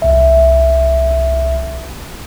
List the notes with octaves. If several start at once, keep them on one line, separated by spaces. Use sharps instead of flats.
C2 E5